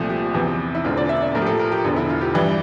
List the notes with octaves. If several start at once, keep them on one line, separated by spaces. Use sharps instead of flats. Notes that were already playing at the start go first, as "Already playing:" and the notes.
Already playing: C2 A#2 F3 A3
G4
E2 C3 E3
E4
E1 E2 D3 A3 C4 F4
D5
E5
D5
A#1 A2 F3 A#4
G4
A4
A#4
G4
E1 E2 D3
E4
F4
G4
G2 E3 G3